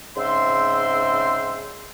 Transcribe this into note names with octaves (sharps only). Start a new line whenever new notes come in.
G#2 C#3 C4 E5 C6